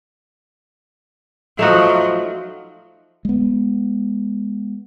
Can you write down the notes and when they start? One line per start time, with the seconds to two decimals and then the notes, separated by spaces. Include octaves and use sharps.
1.59 F3 F#3 A3 D#4 F#4
3.25 G#3 B3